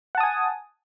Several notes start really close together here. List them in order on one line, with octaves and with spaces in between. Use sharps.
F#5 A5 D#6 G#5